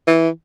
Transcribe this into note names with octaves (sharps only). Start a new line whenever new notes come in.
E3